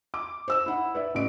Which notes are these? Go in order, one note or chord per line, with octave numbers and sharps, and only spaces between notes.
D6
C5 E6 E7
E4 F#5
B4 D5 E5
A1 D7